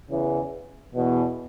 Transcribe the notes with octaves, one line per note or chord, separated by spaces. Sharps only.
E2 C#3 E3
E2 B2